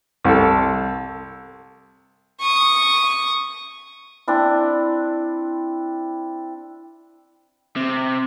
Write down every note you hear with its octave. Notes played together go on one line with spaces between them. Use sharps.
C2 A4
C#6 D#6
C4 D4 E4
C3